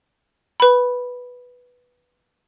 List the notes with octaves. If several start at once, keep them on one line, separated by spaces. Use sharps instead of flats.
B4 B5